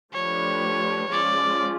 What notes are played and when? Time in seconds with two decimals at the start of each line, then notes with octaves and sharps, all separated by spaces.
0.13 F3 A3 D4 G4 B4 C#5
1.11 F3 G#3 C#4 F4 G#4 D5